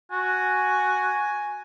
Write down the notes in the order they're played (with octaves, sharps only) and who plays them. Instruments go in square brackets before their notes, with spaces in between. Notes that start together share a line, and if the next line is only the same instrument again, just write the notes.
[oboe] F#4 [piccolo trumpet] G#5